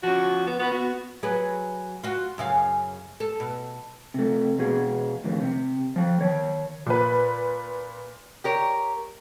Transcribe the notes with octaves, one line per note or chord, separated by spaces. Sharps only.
F3 C#4 F#4
B3
B3 F#4 B4
B3 F#4
F#3 G#4 B4
F4 F#4
F#2 C#3 F5
A4
B2
C3 A3
E2 B2 G#4
F2 A2 D#3
C3
F3 G5
D#3 C#5
A#2 B4
G4 A#4 C#5